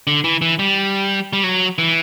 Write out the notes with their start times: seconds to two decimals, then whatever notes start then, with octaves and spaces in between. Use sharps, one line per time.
0.07 D3
0.24 E3
0.42 E3
0.59 G3
1.33 G3
1.44 F#3
1.78 E3